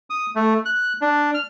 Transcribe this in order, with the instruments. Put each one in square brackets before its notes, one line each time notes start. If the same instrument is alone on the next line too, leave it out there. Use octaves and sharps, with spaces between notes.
[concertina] D#6
A3
F#6
D4
F6